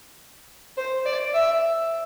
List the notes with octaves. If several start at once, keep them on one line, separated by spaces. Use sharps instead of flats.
C5
D5
E5